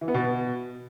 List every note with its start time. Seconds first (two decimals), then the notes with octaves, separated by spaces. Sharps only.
0.01 E3
0.08 B3
0.14 B2